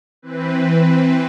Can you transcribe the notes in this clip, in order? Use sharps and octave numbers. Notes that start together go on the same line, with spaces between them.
E3 C4 B4